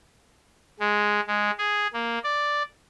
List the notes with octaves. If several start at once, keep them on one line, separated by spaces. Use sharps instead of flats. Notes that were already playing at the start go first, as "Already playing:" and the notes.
G#3
G#3
G#4
A#3
D5